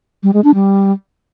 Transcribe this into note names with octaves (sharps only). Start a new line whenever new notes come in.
G3
G#3
D4
G3